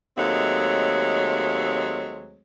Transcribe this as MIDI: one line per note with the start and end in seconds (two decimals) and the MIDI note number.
0.17 2.42 39
0.17 2.42 54
0.17 2.42 56
0.17 2.42 57
0.17 2.42 60
0.17 2.42 73